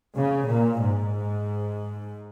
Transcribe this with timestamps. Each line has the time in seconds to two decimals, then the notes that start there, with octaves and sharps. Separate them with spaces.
0.16 C#3
0.48 A#2
0.81 G#2